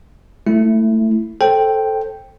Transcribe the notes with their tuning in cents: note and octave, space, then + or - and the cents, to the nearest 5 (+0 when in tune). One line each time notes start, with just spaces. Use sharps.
A3 +15 E4 +0
A4 +0 C5 +20 G5 +0